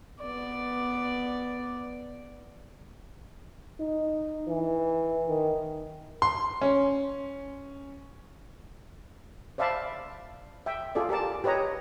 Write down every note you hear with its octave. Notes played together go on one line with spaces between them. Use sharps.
B3 D5
D#4
E3
D#3
C6
C#4
C5 D5 E5 F5 A5 B5
E5 G5
F4 G#4 A4 D5
G4 A#4 D5 A5
G4 B4 C#5 D#5 A#5